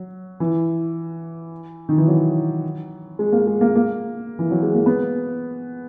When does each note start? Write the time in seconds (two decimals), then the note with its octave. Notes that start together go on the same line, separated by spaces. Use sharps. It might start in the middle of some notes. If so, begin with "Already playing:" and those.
Already playing: F#3
0.40 E3
1.89 D#3
1.98 E3
2.07 F#3
3.19 G#3
3.32 A#3
3.47 G#3
3.61 A#3
3.75 A#3
4.39 E3
4.51 F#3
4.63 G#3
4.75 A#3
4.86 B3